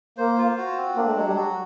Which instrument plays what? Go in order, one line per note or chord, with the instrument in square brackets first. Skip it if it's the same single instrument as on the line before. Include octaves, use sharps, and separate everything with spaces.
[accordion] A#3 [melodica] C5
[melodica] F4
F#4
C4
[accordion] A#3 [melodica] D4
[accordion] A3
[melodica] F#3 [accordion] G#3
[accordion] G3
[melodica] F#4